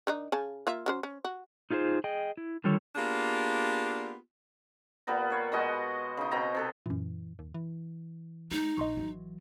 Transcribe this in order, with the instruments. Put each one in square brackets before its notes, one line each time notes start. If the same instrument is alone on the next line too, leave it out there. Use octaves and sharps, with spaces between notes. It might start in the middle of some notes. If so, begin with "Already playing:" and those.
[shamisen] D#3 D4 D#4
C#3 G#5 A5
A#3 F4 E5
F#3 C#4 C5
C#4
F#4
[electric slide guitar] D#4 F4 G#4 B4 C5
G#4 D#5 G5
E4
D3 D#3 G3 F4 A4 C#5
[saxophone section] A#3 B3 D4 F4 G4 G#4
[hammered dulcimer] A#2 G3 B3 A#5
C#5 F5
B2 G#3 F#4 D#5
C#3 D#4
B2 C4 G5 A#5
C3 A4 B4
[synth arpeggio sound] F#2 A#2 [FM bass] E3
[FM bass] D#2
E3
[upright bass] G#3 [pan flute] D#4
[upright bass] A#1 [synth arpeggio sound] D#5 C6 C#6
[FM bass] G#1 [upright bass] E3 F#3